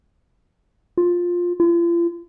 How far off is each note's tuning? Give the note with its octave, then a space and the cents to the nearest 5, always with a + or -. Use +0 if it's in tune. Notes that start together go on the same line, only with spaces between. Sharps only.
F4 +10
F4 -40